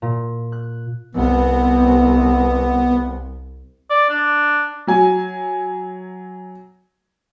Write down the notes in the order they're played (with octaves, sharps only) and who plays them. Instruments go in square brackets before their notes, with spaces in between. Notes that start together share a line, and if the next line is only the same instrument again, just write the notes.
[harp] A#2
F#6
[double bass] C2 [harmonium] B3
[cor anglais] D5
D4
[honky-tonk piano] F#3 G#5